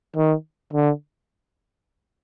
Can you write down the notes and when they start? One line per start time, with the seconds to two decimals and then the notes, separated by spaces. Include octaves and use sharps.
0.16 D#3
0.73 D3